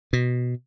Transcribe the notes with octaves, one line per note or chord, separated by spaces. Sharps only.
B2